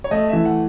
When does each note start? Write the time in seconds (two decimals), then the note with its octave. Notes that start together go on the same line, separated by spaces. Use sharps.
0.04 C#5
0.11 A3 D#5
0.29 E3 E5
0.45 F#5